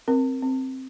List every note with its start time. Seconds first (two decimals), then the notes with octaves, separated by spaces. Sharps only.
0.08 C4 A#4
0.42 C4